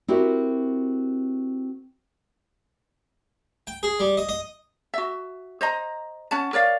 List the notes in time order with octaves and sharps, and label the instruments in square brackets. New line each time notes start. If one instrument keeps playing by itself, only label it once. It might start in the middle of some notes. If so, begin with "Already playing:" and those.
[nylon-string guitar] C4 E4 F#4 G4 A#4
[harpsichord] G5
G#4
G3
D#5
D#5
[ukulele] F#4 E5
C5 D#5 A#5
C#4 F#5 A5
A#4 C#5 D5 F5